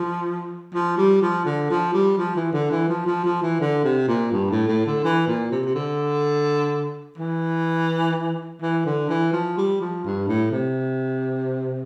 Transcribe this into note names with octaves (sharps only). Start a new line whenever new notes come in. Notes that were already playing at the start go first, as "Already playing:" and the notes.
Already playing: F3
F3
G3
F3
D3
F3
G3
F3
E3
D3
E3
F3
F3
F3
E3
D3
C3
A#2
G2
A2
A2
D3
E3
A#2
C3
C3
D3
E3
E3
D3
E3
F3
G3
F3
G2
A2
C3